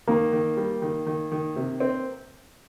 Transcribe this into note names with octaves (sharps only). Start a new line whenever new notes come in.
D#3 A#3
D#3
G3
D#3
D#3
D#3
C3
C4